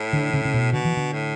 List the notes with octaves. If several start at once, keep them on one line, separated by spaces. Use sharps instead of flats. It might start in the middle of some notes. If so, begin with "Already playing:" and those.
Already playing: A2
D3
C#3
C#3
B2
B2 D3
E3
D3
A2